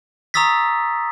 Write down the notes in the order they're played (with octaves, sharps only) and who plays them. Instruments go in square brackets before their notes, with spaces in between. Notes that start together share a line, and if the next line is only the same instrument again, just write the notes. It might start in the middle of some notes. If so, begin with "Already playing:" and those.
[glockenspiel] A#5 C#6 D#6 E6 A6 B6